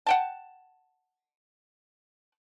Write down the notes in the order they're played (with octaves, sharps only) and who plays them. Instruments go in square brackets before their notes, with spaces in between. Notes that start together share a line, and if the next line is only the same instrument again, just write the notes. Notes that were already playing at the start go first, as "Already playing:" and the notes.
[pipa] F#5 G5 A5